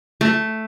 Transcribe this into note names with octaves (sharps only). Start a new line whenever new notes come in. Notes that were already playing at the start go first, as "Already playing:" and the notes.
A3